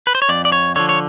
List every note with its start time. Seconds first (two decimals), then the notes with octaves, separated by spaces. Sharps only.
0.07 B4
0.15 C5
0.22 C#5
0.29 F2 D5
0.45 D5
0.52 C#5
0.76 D3 F3 C#5
0.89 C#5